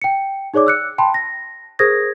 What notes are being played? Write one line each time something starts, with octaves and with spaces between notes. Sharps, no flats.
G5 C#7
D#4 G#4 C#5 D5 D6
E6 F#6 C#7
G5 A5 B5 C6
A#6
G#4 A#4 C5 D#6 G#6 A#6